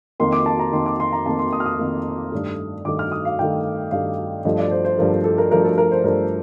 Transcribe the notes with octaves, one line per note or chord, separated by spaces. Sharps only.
F2 D#3 A#3 C6
D6
A5
A#5
F2 D#3 A#3 C6
D6
C6
A#5
F2 D#3 A#3 A5
C6
D#6
F6
D#6
F2 D#3 A#3
G2 D#3 A3
G2 D#3 A3 D6
F6
D#6
F5
G2 D#3 A3 G5
G2 D#3 A3 F5
G2 F3 A3 D#5
D5
C5
C5
G2 F3 A3 A#4
A4
A4
A#4
G2 F3 A3 A#4
A4
A#4
C5
G2 F3 A3 A#4